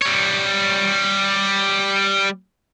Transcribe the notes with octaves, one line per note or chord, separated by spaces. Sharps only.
G3 C#5